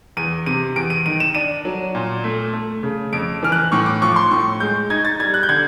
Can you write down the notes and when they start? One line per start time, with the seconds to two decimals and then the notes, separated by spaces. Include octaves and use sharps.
0.17 E2 D#7
0.46 C3 D#7
0.76 E2 D7
0.90 D#7
1.06 D#3 D#7
1.20 E7
1.35 D4 D#7
1.65 F#3
1.95 A#2
2.24 A3
2.53 A3
2.83 C#3
3.13 F2 D7
3.43 E3 F6
3.52 F#6
3.72 A2 C#6
3.86 D6
4.02 F3 C#6
4.16 C6
4.31 A2 C#6
4.60 G#3 G6
4.90 D#4 G#6
5.05 A6
5.19 G3 G#6
5.34 F#6
5.43 G6
5.49 D3 G#6